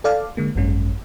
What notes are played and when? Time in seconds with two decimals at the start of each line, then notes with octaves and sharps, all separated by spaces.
0.04 A4 D5 F5
0.37 D3 G#3 A#3
0.56 G#1 F#2 G#3 C#4